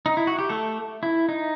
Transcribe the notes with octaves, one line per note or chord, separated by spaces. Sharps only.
D#4
E4
F#4
G4
A3 A4
E4
D#4